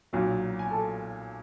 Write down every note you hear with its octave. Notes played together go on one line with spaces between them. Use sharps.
B1 A#2 F#3
G#5
A4 A5